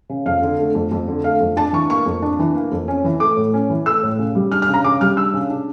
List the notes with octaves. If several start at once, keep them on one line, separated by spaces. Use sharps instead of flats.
C#3
F2 F5
D3
A3
F2
F2
D3
A3 F5
F2
D4 A5
E3 C#6
A#3 C#6
F2
D4
E3
A#3
F2
C#4
E3
A3 D6
A2
C#4
E3
A3 E6
A2
C#3
G3
D4 F6
F6
C#3
A#5
C#3 D6
G3 F6
D4 E6
C#3
D4